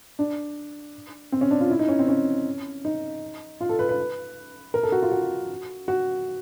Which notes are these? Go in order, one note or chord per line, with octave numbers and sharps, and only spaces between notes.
D4
C4
C#4
D4
F4
E4
D#4
C#4
C4
C#4
D#4
F4
A4
B4
B4
A#4
A4
F#4
F4
F#4
F#4